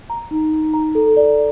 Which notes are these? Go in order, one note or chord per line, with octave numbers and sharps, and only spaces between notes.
A#5
D#4
D#4
A#5
A4
D5